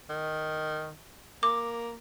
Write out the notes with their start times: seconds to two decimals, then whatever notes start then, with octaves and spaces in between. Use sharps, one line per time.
0.09 D#3
1.43 A#3 D6